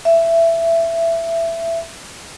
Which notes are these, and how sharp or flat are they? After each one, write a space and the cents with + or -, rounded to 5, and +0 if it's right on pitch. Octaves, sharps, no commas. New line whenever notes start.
E5 +15